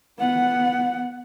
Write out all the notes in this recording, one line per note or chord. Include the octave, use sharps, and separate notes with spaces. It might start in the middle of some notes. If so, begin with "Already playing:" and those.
B3 F#5